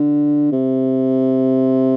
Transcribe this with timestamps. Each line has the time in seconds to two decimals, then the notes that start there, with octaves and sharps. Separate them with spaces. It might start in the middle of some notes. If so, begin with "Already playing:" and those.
Already playing: D3
0.52 C3